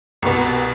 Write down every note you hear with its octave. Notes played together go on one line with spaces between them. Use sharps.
C2 B2 B3